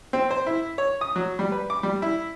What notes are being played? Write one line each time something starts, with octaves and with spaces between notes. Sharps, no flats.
C4
C5
E4
C#5
D#6
F#3
G3
B4
D6
G3
E4